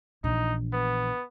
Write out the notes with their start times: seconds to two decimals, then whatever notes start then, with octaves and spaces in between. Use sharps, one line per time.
0.24 A#1 E3 D#4
0.73 B3